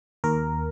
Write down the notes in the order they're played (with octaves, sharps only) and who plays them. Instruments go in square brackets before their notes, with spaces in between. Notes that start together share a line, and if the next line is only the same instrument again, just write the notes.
[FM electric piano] D#2 A#4